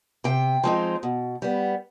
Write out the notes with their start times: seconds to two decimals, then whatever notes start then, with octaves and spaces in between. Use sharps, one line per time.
0.24 C3 G5
0.64 F3 G#3 C4 D#4
1.03 B2
1.42 G3 B3